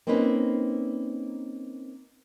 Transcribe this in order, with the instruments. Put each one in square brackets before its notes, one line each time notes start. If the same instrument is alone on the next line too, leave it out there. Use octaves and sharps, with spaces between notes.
[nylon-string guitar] A#3 C4 C#4 D#4 B4